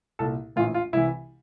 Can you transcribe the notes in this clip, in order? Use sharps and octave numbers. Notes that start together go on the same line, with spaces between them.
C2 A#2 A4
A#1 A2 E3 F4
F4
C2 C3 E3 E4